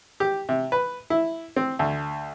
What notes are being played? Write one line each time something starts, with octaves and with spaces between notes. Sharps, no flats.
G4
C3
B4
E4
C4
D2